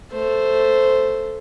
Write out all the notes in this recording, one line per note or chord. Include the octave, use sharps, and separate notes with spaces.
A3 C5